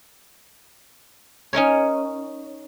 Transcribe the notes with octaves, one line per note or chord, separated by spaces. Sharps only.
C#4 D#4 A#4 C#5